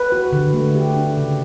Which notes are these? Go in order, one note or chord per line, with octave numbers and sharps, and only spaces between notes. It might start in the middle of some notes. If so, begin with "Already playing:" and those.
Already playing: B4
F#4
D3
A3
G4
D4
C#3